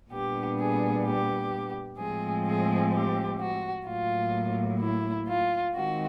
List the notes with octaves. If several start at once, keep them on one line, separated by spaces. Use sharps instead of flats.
A#2 G3 B3 D4 G4
G#4
G4
A2 F3 G#3 C4 G#4
G#4
G4
F#4
A2 F#3 A#3 F4
E4
F4
D#3 G#3 C4 F#4